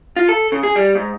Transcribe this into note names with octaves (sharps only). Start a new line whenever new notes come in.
F4
A4
C#3
G#4
G3
G#2